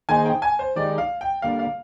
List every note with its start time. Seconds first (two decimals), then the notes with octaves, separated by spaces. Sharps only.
0.09 D#3 A#3 D#4 G#4 C5 G#5
0.26 G5
0.42 G#5
0.59 C5
0.76 D#3 G#3 D#4 G4 D5
0.98 F5
1.21 G5
1.42 D3 G3 A#3 F5
1.59 F5